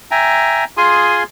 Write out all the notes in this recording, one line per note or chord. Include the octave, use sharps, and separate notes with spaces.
E5 G5 G#5 A#5
F4 G#4 G#5 C6 D#6